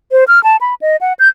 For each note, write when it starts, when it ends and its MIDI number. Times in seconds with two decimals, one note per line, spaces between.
0.12 0.24 72
0.28 0.42 89
0.44 0.57 81
0.61 0.74 83
0.82 0.96 75
1.01 1.13 78
1.19 1.29 91